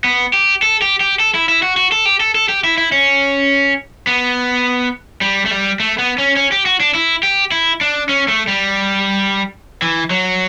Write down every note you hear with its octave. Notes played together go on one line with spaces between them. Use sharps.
B3
G4
A4
G4
G4
A4
E4
E4
F#4
F#4
A4
G4
A4
A4
G4
E4
E4
C#4
B3
G3
A3
G3
A3
B3
C#4
C#4
G4
F#4
D4
E4
G4
E4
D4
C#4
A3
G3
E3
F#3